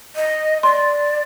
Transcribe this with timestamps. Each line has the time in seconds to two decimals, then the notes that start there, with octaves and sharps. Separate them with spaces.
0.16 D#5
0.63 D5 C6